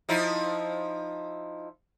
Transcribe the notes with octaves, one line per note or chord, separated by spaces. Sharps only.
F3 D#4 E4